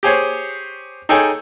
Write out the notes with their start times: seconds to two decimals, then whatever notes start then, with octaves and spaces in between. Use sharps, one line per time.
0.03 G4 G#4 C5 C#5
1.09 D#4 G#4 A4 C#5 G5 G#5